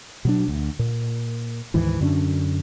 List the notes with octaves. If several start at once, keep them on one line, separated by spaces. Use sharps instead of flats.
B2 F#3 D4
D2
A#2
D2 G#2 D#3 E3
F#2 D3 C#4 D4